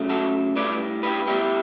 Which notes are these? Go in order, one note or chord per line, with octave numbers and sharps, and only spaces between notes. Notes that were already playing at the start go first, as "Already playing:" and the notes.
Already playing: C#3 F#3 A3
F#4 A4
A2 G3 B4 D5
G4 B4
B2 G3 E4 G4